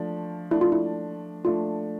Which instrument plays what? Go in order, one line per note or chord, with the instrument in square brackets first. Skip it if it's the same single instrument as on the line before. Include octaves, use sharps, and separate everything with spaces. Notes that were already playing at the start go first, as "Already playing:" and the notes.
Already playing: [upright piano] F3 A3 D4
[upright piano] F3 A3 D4 [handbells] E4
[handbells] F4
E4
[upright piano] F3 A3 D4 [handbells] F4